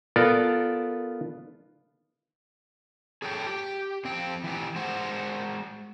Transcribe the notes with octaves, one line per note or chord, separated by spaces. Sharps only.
B3 F4 A4 A#4 D5
G#4 A4 C#5 F5 G5
G4
F2 C4 G5
E3 G4
G#3 F#4 C5